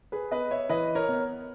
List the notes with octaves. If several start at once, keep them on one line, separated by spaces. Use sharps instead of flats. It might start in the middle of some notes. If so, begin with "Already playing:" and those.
G#4 B4
B3 B4 D#5
C#5 E5
E3 B4 D#5
A#4 C#5
B3